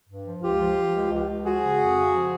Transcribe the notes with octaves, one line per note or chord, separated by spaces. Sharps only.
G2
F3
C#2 F4 G4
F3
F3
C#2
C#2
C#2
F3 F#4 G#4
C#3
F2
C#3
F3